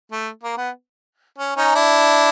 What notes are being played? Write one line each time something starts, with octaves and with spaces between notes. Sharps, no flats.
A3
A#3
B3
C#4
C#4 D#4
D4 E4